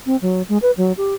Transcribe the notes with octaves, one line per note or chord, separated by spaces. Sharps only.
C4
F#3
G#3
B4
F#3
G4